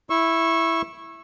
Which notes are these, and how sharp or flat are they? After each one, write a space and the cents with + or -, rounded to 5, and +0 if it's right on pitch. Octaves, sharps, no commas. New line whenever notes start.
E4 +0 C#6 -20 E6 +0